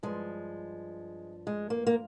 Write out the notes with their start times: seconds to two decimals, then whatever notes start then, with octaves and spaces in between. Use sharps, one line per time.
0.03 G2 F3 G#3
1.47 G#3
1.70 A#3
1.87 A#3